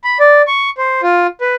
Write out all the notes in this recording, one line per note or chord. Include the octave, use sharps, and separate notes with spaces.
B5
D5
C#6
C5
F4
B4